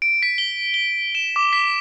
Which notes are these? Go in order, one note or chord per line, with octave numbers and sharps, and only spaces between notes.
D7
B6
G7
G7
E7
D6
B6